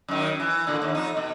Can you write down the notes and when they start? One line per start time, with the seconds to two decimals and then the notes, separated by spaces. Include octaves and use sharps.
0.08 F#2 D#3
0.40 E3
0.67 A#2 D3
0.82 D#2
0.95 F2 D#4
1.17 B2